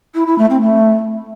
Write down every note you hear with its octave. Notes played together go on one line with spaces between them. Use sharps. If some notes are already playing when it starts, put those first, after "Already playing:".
E4
E4
A3
C4
A3